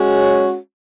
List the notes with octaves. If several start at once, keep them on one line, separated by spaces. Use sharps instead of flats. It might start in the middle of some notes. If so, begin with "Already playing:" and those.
Already playing: G#3 C#4 F#4 C#5